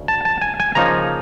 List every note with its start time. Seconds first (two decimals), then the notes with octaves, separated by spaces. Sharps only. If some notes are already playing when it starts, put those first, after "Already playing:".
Already playing: D2 C#3
0.08 A5
0.25 A5
0.41 G#5
0.60 G#5
0.75 C#3 F3 A#3 D#4 A#5